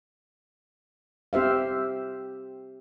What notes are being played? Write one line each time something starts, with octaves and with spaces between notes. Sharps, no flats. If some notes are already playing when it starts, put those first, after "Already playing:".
C4 G4 C5 E5 F5